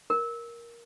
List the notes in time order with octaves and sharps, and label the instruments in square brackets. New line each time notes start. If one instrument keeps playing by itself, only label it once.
[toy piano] A#4